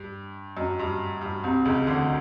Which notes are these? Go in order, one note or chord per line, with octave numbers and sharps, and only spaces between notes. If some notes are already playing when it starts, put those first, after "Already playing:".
Already playing: G2
F#2
G2
G2
C2 C3
C#2 C#3
D2 D3